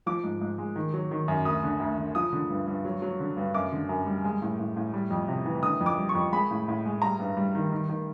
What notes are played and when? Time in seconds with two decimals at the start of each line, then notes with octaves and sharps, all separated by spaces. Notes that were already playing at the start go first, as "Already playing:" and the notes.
0.06 F3 D6
0.24 G#2
0.41 G#2
0.58 G#3
0.76 D#3
0.94 F#3
1.11 D#3
1.28 F#2
1.45 D2 D#6
1.64 D3
1.80 D2
1.98 D3
2.15 F3 D#6
2.33 D3
2.50 G2
2.67 G2
2.85 F#3
3.02 F#3
3.20 D3
3.37 G2
3.54 F#2 D6
3.72 D3
3.89 F#2
4.07 G3
4.24 G#3
4.42 A2
4.59 A2
4.76 A2
4.94 G3
5.10 F2
5.28 C3
5.45 E3
5.62 D3 D#6
5.81 F2
5.86 D6
5.98 G3
6.09 C#6
6.15 F2
6.33 G#3 B5
6.51 A2
6.68 A2
6.85 G#3
7.02 G3 A#5
7.20 G2
7.37 G3
7.55 D#3
7.72 D#3
7.89 D#3